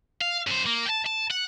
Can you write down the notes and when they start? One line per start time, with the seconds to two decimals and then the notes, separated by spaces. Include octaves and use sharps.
0.21 F5
0.47 F#2 C5
0.66 A#3
0.86 G5 A5
1.06 A5
1.31 F#5